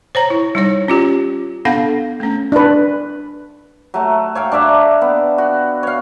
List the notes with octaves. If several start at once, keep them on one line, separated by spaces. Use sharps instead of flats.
C5 C#5 A#5
E4
G3 D#4 C#5
C#4 F4 G4
B3 D4 A4 F5 F#5
A3 C#4
D4 B4
F#3 A3
C#5 F5 G5
D4 D5 E5 A#5
B3
F#4
C#5 F5